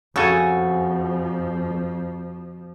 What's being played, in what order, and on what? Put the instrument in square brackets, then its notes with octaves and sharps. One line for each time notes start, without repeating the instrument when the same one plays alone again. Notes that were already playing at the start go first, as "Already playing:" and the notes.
[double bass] F2 F3 [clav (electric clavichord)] C#3 A4 G#5 [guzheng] F#4